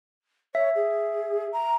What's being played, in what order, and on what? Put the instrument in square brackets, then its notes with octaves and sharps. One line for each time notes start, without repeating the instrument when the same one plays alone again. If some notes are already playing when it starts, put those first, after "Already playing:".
[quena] C#5 [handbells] E5
[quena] G#4
A#5